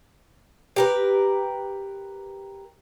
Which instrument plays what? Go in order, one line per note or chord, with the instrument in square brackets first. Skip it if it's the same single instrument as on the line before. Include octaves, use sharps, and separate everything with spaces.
[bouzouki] G4 A#4 B4